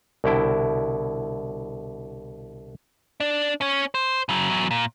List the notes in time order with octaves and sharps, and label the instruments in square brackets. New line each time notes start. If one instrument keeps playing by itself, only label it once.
[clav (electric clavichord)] C2 B2 D3 E4 G5
[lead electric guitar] D4
C#4 C#5
C5
C#3 F#3
E2 F#3
A#2